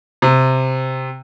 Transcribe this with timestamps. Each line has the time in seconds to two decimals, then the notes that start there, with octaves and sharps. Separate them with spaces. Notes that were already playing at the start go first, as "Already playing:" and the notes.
0.22 C3